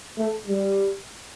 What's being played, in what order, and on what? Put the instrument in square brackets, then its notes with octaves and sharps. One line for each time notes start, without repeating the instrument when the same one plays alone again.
[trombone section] A3
G3